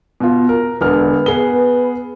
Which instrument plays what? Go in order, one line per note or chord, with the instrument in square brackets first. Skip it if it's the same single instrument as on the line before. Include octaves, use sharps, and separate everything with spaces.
[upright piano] B2 F4
A#4
[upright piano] E1 D3 F6 [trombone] B4
[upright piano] B3 G#4 G7